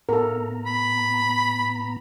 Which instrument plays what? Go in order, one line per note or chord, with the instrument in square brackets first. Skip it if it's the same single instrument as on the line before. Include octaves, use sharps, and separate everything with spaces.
[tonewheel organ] A2 B3 A#5 [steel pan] A4 A#4
[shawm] B5